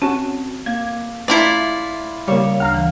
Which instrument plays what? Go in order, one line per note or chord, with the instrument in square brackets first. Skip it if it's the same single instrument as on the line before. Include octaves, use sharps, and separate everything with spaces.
[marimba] C4 [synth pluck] C#4 F#4 [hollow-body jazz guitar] A5
[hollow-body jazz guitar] A#3 [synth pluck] G#6
[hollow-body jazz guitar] A3 A5 A#5 [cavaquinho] E4 F4 D5
[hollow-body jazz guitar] C#3 C#5 [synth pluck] G3 A#3 [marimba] D6
[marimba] D2 [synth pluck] F5 A#5 F6
[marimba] E3